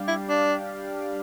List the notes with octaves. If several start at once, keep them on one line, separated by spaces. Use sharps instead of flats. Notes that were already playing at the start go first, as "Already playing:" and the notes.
Already playing: G3 D4 G4 D5 F5
E4
D4